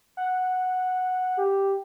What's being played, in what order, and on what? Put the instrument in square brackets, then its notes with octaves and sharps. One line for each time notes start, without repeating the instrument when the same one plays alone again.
[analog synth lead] F#5
[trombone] G4